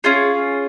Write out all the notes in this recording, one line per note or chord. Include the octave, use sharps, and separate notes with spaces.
C#4 F4 G#4